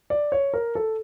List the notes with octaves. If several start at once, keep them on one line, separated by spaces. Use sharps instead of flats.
D5
C#5
A#4
A4